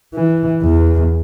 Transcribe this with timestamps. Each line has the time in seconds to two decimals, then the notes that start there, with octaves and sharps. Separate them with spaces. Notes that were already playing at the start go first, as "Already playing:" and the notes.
0.14 E3
0.62 E2